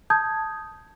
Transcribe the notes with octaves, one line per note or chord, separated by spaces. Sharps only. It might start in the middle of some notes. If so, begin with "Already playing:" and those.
A5 D#6 G6 G#6